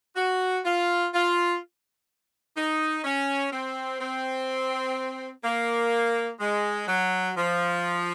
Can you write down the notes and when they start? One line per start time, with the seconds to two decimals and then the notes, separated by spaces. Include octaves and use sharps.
0.16 F#4
0.64 F4
1.13 F4
2.56 D#4
3.04 C#4
3.52 C4
4.00 C4
5.44 A#3
6.40 G#3
6.88 F#3
7.36 F3